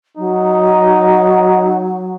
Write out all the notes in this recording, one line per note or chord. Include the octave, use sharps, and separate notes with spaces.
F#3 D#4